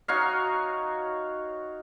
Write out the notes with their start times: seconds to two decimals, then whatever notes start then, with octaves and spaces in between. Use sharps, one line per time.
0.08 D#4 F#4 C#5 F5